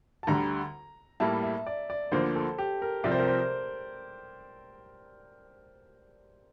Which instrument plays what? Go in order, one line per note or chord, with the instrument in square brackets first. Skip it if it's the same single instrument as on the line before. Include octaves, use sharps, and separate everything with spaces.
[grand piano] A5
[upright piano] D2 D3 G3 [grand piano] A#5
[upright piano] A2 G3 A#3 E4 [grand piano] A5
[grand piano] E5
D5
D5
[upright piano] D2 D3 F3 A#3 [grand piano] C5
[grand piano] A4
G4
A#4
[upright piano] C2 C3 F3 C4 [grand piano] D5
[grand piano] C5
A#4
C5